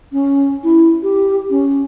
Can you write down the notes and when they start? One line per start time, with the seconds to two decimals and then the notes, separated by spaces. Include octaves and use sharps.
0.12 C#4
0.64 E4
1.03 G4
1.50 C#4